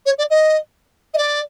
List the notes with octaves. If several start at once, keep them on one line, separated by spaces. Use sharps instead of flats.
C#5
D5
D#5
D#5
D5